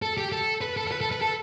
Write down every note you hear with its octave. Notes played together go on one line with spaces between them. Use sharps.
A4
G4
A4
B4
A4
A4
B4
A4
B4
A4